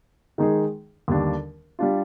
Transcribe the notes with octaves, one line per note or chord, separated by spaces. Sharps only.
D#3 G#3 D#4 G#4
D#2 D3 G3 D4
G3 D4 F4